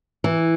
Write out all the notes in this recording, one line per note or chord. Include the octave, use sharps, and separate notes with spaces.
E3